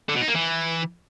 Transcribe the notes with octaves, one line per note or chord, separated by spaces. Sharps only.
D3
B2
D#4
A#3
E3